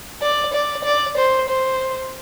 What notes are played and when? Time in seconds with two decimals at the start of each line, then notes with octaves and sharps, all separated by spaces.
0.22 D5
0.53 D5
0.84 D5
1.17 C5
1.49 C5